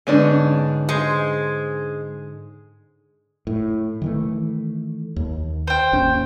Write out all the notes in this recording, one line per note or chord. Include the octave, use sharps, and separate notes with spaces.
G#2 D3 B3 C#4 D4
G#3 G#4 C5
A2
D#3 E3 A3
D#2
C5 G5
G#1 D#2 C#4